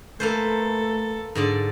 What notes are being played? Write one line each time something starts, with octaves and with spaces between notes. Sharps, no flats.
A3 A#3 A4 B4 C5
G#2 D3 D5